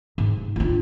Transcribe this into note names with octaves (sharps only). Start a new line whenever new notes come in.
G#2
D4 F4